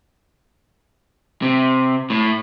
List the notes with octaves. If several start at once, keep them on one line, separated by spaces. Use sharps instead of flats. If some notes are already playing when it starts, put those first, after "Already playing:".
C3
A2